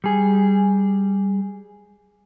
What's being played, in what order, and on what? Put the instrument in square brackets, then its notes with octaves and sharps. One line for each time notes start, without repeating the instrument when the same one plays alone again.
[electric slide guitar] G3 G#4